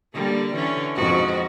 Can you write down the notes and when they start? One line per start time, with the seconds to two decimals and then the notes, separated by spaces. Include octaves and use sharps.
0.14 D3 G3 A#3
0.54 D3 E3 C#4
0.96 F2 G#2 F#4